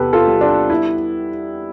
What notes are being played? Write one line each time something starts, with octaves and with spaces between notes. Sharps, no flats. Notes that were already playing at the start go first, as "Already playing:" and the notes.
Already playing: E2 C3 B3 G4 A4 B4
F4 A4
G3
D4 F4
E4